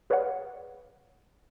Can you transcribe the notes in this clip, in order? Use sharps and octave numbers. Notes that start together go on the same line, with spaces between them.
G#4 B4 C#5 D5 F5 F#5